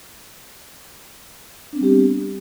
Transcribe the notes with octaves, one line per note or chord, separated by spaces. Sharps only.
G3 B3 C4 D4 G4